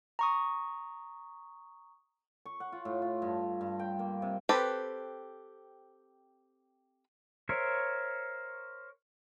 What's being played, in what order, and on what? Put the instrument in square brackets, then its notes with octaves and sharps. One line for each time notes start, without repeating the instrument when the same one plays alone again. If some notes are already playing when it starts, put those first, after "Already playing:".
[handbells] A#5 C#6 D#6
[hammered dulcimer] C#6
F#5
F4
A2
F4
G2
G2
G5
A#3
C3
[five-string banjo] C4 G4 A4 B4
[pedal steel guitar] A#4 C5 C#5 E5